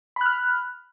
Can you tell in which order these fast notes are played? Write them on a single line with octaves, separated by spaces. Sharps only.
B5 F#6 F6